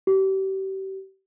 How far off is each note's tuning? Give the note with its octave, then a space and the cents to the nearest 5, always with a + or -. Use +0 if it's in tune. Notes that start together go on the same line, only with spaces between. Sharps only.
G4 -35